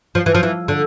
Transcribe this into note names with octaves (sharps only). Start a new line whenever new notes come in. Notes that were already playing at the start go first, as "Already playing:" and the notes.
F3
E3
F3
E3
D3